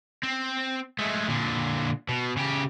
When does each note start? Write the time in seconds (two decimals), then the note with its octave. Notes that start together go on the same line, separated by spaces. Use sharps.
0.23 C4
0.99 G#3 A3
1.28 A#2 D3
2.09 B2
2.37 C#3 G4